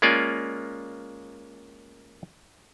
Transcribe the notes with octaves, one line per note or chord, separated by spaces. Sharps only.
G#3 A#3 C#4 F4 D5 G#5